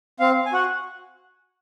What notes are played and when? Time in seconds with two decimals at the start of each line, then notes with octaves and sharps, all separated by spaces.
0.20 C4 F5
0.46 G#5
0.53 F#4 F#5